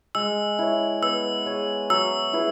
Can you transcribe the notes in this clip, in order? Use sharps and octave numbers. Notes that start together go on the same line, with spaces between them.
G#3 E6
E4 C#5
B3 E6
G#4 C#5
F#3 E6
E4 G#4 B4